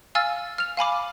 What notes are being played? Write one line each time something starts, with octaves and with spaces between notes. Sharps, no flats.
F5 G#5 E6 F6 A6
F6 F7
F5 G#5 B5 D6